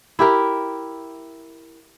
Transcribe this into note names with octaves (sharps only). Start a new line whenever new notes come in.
E4 G4 A#4